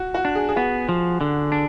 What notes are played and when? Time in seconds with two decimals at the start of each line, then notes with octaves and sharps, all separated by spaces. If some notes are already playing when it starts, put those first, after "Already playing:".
Already playing: F#4
0.14 F#4
0.25 D4
0.35 G#4
0.49 G#4
0.56 B3 F#4
0.89 F3
1.21 D3
1.52 D4